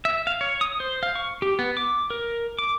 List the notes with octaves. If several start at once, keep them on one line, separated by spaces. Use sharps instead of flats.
E5
F5
C#5
D#6
C5
F5
C#6
G4
B3
D6
A#4
D6